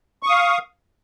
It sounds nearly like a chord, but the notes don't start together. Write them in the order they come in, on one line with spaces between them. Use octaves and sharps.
C#6 D#6 F5